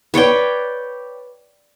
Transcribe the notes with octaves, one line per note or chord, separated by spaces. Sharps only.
B4 C#5 D5 G5